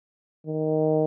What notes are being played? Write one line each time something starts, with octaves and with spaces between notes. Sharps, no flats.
D#3